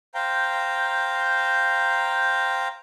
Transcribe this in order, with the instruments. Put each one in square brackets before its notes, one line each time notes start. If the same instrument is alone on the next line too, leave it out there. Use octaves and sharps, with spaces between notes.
[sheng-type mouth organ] C5 F5 G5 A#5